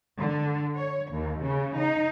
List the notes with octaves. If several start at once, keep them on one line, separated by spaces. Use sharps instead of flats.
D3
C#5
D#2
C#3
D#4